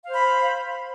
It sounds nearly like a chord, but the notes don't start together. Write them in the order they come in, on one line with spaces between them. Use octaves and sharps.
F5 C5 B5